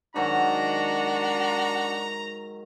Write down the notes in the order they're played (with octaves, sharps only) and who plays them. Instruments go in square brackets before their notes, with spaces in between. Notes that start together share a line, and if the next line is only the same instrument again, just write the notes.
[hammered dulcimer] G#2 D#3 F#3 [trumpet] D4 [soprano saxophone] F#4 [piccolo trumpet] A#5